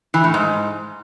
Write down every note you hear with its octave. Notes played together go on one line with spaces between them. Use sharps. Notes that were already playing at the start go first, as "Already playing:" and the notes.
E3
A2
G#2